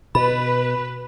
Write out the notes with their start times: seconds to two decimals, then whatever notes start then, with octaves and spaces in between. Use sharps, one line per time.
0.15 B2 B4 B5